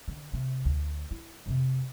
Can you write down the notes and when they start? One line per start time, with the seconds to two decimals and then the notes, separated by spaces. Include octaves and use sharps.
0.08 D3
0.34 C3
0.65 D2
1.11 E4
1.46 F2 C3